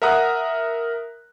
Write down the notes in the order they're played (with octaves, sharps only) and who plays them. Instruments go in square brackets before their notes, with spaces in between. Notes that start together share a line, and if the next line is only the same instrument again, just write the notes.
[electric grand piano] A#4 E5 F#5 A#5 D#6 F#6